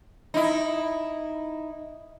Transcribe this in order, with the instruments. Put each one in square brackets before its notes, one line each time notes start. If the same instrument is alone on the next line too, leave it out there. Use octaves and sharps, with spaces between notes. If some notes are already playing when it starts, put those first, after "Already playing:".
[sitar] D#4 E4